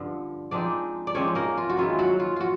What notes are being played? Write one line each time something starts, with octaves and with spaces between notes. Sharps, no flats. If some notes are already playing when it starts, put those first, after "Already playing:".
Already playing: G2 D3 F3
F3 G#3 C4 D4 D#4 D5
D5
F3 G#3 C4 C#4 D#4 C#5
A#3 A#4
F4
F#4
D#3 G#3 C#4 E4 F4
F#3 F#4
F4
F4 F#4